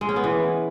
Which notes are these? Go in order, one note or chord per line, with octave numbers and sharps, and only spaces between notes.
G#3
C#4
B3
E3